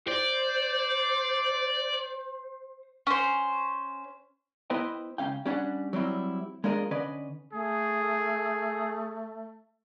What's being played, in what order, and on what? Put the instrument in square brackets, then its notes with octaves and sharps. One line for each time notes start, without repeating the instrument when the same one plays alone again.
[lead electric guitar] C5 [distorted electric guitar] D5
[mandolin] C#4 C5
[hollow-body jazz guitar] B3 E4 B4 C5 D#5 G5
C#2 C#4 F5 G5
G3 C#4 D4 F#5
F#3 G3 C4 E4
G#3 A#3 D4 F4 A#4 D#5
D3 C#4 B4 D5 D#5
[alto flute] A3 [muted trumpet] G#4